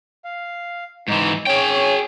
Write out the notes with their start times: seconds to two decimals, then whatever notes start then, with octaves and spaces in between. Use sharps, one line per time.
0.25 F5
1.08 G#2 E3 D#4
1.46 C#4 G#4 C#5 G5